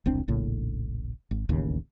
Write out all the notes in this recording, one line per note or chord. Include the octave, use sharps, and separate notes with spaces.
E1 C2 C4 D4
D#1 A#1 A2 C#3
G#1
D1 A1 D#2 C#3